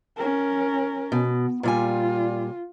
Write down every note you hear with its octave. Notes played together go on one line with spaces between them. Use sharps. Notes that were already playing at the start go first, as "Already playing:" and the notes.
C#4 A#4
B2
A#2 G3 F4 G#5